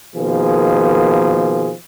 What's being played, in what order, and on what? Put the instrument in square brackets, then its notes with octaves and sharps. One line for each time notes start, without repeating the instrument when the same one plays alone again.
[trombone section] B2 D#3 F3 A#3 G#4